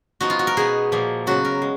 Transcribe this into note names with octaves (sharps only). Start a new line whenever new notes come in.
F3 B3 D#4 F#4
F4
F#4
A#4
B2 G#3 B3 D#4 G#4
A#2 F3 A#3
C#3 F#3 B3 F#4
A#4
G#3